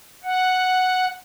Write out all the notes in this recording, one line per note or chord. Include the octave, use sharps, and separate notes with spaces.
F#5